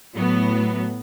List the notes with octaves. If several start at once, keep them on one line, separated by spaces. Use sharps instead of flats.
A2 F#3 B3